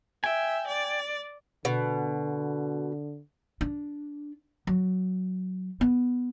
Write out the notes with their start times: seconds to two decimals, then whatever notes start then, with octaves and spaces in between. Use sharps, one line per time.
0.24 E5 G5 G#5
0.67 D5
1.65 B2 D3
3.61 D4
4.67 F#3
5.81 B3